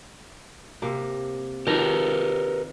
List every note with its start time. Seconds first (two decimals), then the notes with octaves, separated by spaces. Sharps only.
0.82 C3 A#3
1.67 D#3 F3 G4 A#4 B4